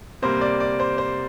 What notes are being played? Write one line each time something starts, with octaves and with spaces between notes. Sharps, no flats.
C3 G3 A#3 C5
D5
D5
C5
C5